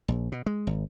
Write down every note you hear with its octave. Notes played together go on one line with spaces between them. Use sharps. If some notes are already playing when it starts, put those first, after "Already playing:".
A#1
B2
G#3
G#1